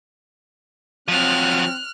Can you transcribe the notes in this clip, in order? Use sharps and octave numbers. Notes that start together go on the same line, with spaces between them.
F3 F#3 C4 F6 F#6